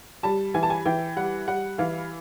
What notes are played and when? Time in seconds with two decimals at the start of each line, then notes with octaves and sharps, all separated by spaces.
0.23 G3 A5
0.54 E3 G#5
0.63 A5
0.70 G#5
0.85 E3 G5
1.16 G3 F#5
1.48 G3 F#5
1.78 E3 F5